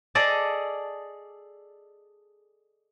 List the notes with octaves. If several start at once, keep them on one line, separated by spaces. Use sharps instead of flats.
G#4 A4 D5 D#5